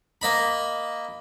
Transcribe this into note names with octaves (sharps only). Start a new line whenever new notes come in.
A#3 D#5 B5